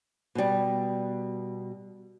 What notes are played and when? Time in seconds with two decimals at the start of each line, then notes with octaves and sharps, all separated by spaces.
0.35 B2 G3